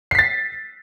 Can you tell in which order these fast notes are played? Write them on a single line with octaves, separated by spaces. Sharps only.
C7 B6 A6